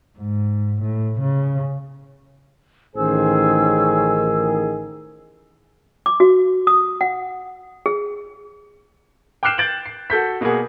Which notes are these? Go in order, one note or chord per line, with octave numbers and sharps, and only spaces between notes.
G#2
A2
C#3
A1 D#3 C#4 G#4 C5 E6
D6
F#4
D#6
F#5
G#4
G5 D6 F6 F#6 C7 E7
G6 A6 D7 F#7
C7
F#4 A4 G6 B6
B2 A#3 B3 F#4 G#4